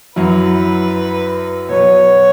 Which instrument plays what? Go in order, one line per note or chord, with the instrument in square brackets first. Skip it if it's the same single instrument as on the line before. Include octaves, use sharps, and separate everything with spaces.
[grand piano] F#2 F#3 E4 [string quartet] B4
[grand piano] B2 F#3 B3 [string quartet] C#5